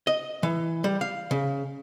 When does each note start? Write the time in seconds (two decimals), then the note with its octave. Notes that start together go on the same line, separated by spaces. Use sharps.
0.07 D#5
0.43 E3
0.84 G3
1.01 F5
1.31 C#3